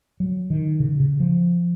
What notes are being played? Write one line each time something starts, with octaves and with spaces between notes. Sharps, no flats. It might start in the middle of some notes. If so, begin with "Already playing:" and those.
F#3
D#3
C#3
C#3
F3